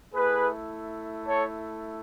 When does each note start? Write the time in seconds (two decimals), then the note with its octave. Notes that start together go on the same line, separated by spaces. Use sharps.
0.13 A3 E4 G#4 B4
1.25 A4 C#5